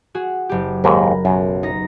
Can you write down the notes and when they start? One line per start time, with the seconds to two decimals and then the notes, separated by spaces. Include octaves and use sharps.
0.15 F#4 G#4
0.49 F#1 G4
0.84 D#2 G#2 A#4 B5
1.25 B1 F#2
1.63 D#4 A#6